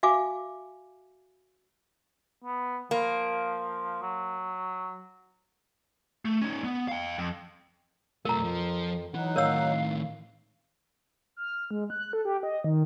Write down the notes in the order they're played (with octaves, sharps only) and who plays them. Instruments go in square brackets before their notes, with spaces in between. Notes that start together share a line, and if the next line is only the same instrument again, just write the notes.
[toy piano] F#4 E5 F5 G#5 D6
[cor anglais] B3
[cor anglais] F3 [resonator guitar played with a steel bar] A#3
[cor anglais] F#3
[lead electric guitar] A3
C#4 D#4
B3
F5 G5
F2
[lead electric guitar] B1 A3 [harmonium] F2 [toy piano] A#4 A#5
[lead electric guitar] F3
[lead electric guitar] E3 [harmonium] F#3 D#4 F#5
[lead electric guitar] A2 D#3 [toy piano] A#4 C#5 E6 [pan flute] F5
[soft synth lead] F6
G#3
F#6
A4
G4
D#5
D#3